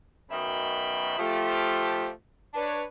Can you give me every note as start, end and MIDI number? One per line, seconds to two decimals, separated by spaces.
0.30 1.16 42
0.30 1.16 47
0.30 1.16 51
0.30 1.16 76
0.30 1.16 79
0.30 1.16 83
1.19 2.09 53
1.19 2.09 57
1.19 2.09 67
2.54 2.84 62
2.54 2.84 71
2.54 2.84 73